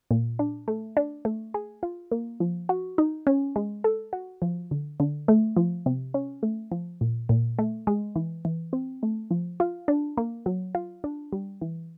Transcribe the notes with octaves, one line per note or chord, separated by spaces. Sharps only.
A#2
D4
A3
D4
A3
G#4
F4
A#3
F3
F#4
D#4
C#4
G#3
A4
F#4
F3
D3
D3
A3
F3
C3
C#4
A3
F3
A#2
A#2
A3
G#3
E3
E3
C4
A3
F3
F4
D4
A#3
F#3
F4
D4
G3
E3